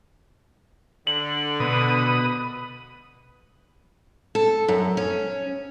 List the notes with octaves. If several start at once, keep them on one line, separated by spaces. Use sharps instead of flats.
D3 F#7
B2 B4 D#6
A4
F#2
C#4